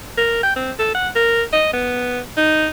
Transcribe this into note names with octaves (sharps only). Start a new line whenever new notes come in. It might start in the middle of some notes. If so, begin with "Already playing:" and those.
A#4
G5
C4
A4
F#5
A#4
D#5
B3
D#4